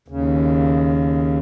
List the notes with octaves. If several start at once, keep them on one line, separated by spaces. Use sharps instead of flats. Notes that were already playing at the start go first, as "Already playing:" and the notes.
D#2 C#3